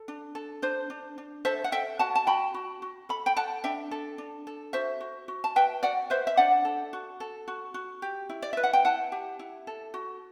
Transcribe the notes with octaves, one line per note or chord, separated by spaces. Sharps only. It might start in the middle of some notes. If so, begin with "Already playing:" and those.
Already playing: A4
D4
A4
D4 C5
D4
D4
A4 C5 E5
F#5
A4 E5 G5
F#4 F#5 A5
A5
F#4 G5 B5
F#4
F#4
A4 B5
G5 B5
A4 F#5 A5
D4 E5 G5
A4
D4
A4
F#4 C5 E5
F#4
F#4
A5
B4 E5 G5
F#4 D5 F#5
B4 C5 E5
E5
D4 D5 F#5
A4
F#4
A4
F#4
F#4
G4
E4
D5
B4 E5
F#5
G5
E4 F#5 A5
G4
E4
A4
F#4